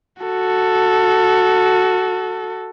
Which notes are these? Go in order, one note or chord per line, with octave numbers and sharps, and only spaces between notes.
F#4 A4